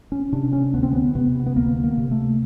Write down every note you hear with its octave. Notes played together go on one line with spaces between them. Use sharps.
C#4
C3 D4
C#4
D2 B3
C4
B3
C3 B3
B3
D2 A#3
A#3
C3
A3